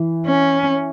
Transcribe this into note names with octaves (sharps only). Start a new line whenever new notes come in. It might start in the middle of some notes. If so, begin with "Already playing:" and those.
Already playing: E3
C#4